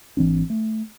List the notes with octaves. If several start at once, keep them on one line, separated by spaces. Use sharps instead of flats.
G#1 E3 C4 D4
A3